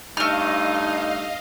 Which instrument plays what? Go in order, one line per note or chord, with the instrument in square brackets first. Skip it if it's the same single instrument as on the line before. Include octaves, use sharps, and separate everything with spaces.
[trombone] G2 [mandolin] A3 F6 [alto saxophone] D#4 [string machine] D#5 F5